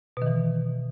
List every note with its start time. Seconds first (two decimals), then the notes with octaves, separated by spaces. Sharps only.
0.17 B2
0.22 D#3
0.26 E3